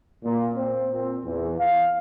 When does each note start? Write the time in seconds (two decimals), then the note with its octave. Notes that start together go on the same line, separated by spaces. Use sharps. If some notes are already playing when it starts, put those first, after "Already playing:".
0.23 A#2
0.55 C4
0.92 A#2 C4
1.24 E2
1.59 F5